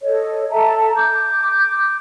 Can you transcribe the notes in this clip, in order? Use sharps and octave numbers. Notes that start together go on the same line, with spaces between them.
A4 C#5 D#5
A4 E5 A5 A#5
D6 G6